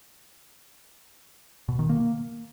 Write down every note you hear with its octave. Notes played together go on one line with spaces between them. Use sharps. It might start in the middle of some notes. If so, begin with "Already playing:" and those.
B2
D#3
A#3